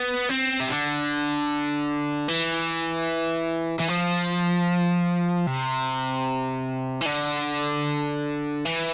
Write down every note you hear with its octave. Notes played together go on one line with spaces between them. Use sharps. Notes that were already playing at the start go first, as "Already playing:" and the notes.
Already playing: B3
C4
C3
D3
E3
E3
F3
C3
E3
D3
E3